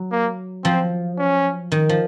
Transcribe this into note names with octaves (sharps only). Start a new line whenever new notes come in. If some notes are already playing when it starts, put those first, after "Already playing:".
Already playing: F#3
A#3
F3 C4
C#4
D#3
F3